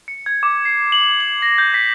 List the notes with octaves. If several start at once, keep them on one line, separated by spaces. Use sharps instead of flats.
C#7
G#6
D6
C7
F#7
F#7
A#6
G6
B6